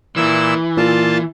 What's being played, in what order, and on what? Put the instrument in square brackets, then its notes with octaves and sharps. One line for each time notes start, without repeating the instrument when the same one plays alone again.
[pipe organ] A#2 E4 E6 [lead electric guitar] E3
[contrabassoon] A#2 [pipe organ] F4 A5